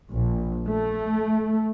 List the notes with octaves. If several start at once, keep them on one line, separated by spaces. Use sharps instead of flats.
A#1
A3